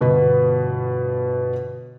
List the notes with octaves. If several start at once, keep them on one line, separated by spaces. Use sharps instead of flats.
G1 B2 B3 B4 D#5